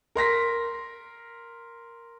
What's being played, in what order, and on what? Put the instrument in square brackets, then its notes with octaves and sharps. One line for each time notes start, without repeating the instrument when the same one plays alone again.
[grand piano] A#4 C6 A#6 B6